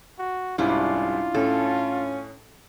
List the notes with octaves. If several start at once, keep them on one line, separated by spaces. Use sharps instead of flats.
F#4
C2 G#2 G3 C#4 D4 E4 F4
A2 C#4 A4